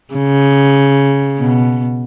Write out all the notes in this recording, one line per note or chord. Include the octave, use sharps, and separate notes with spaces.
C#3
B2